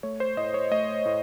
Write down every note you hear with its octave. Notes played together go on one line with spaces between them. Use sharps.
A3 C#5
C5
A2 D#5
C#5
A3 D#5
A2